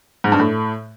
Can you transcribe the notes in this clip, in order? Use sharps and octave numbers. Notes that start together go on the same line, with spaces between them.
G#2
G2
A2